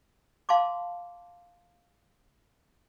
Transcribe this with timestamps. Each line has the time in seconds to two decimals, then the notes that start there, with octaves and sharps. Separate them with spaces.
0.49 F5 A5 C6 D6